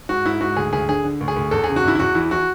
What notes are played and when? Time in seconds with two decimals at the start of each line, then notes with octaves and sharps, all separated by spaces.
0.09 G#2 F#4
0.25 G#2 E4
0.41 G#2 F#4
0.56 D2 G#4
0.73 D2 G#4
0.88 D3 G#4
1.04 D3
1.21 D2
1.28 G#4
1.36 D2
1.51 E2 A4
1.64 C#3 G#4
1.76 F#4
1.84 E2 E4
1.95 E4
1.99 E2 F#4
2.15 E3 E4
2.31 E3 F#4